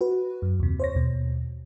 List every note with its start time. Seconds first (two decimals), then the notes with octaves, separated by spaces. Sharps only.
0.01 F#4 B4
0.42 F#2
0.60 D#2 C3
0.80 C5 C#5 A#6
0.95 D#2 B2